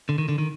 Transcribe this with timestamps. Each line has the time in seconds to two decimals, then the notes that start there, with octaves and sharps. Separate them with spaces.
0.09 D3
0.18 D#3
0.29 D3
0.38 D#3